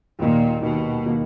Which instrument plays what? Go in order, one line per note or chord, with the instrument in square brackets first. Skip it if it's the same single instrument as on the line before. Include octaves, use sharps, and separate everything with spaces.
[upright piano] D#2 D#3 A#3 D#4 [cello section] A#2
[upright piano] D#2 D#3 A#3 D#4 [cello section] B2
[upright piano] D#3 A#3 D#4